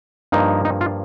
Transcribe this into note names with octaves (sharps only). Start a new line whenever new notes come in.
G2 F3 A#3 D#4
D#4
F4